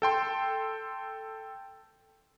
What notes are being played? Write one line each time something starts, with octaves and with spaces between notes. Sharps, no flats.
A4 G5 C6